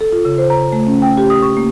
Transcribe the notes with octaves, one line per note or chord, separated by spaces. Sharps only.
A4
F4
C#3
C5
A#5
A3
C#4
G5
G4
D#6
C#6
A#3